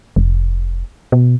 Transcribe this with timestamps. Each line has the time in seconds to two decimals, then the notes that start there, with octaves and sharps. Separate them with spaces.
0.16 F1
1.12 B2